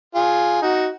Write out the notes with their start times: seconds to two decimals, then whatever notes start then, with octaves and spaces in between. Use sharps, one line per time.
0.15 F4 G#4
0.62 D#4 F#4